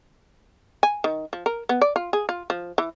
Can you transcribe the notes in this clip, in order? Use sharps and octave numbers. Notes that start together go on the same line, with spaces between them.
G#5
D#3
F3
A#4
B3
D5
F4
G#4
F4
F3
E3